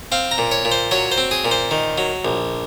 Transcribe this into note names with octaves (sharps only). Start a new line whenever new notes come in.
C4 F5
A#5
A#2
C#5
A#2
C5
F#3 C#5
C5
C4
G#4
A#2
C5
D#3
F#3
A#1